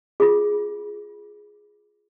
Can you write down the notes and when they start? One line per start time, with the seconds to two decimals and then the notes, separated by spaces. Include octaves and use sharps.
0.20 F4 G#4